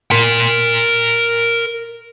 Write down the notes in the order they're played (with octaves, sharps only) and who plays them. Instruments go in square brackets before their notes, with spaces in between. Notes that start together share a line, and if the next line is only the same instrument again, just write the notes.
[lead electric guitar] A#4 C6